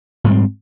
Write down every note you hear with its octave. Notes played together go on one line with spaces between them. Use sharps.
G#2 G3 C4